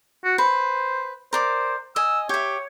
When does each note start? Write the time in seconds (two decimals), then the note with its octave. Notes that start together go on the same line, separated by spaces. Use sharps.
0.25 F#4
0.38 B4 C5
1.33 A#4 C5 D5 D6
1.96 D#5 G#5 E6
2.29 G4 C#5 E5